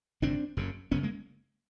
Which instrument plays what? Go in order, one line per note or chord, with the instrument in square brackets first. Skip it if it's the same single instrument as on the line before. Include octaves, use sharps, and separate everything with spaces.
[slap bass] G#1 F#2 C#3 C4 D4
F#1 F#2 C#3
F#1 F#2 C#3 B3 C#4
G#3 A#3